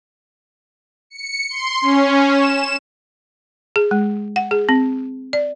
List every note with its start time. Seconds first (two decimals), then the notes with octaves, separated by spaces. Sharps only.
1.10 C#7
1.50 C6
1.82 C#4
2.30 E7
3.76 G#4
3.91 G#3
4.36 F#5
4.51 G#4
4.69 C4
5.33 D5